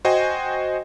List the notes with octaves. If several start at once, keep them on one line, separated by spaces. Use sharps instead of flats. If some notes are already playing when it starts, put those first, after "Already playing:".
F#4 C5 D#5 G5 G#5